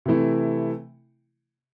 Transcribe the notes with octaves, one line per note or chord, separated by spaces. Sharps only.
C3 E3 A3 E4